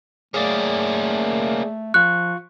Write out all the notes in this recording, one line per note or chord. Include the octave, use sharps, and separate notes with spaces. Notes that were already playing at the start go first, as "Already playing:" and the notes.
A3 A#3 C#4 G#4 D5
F3 F4 C#6 F#6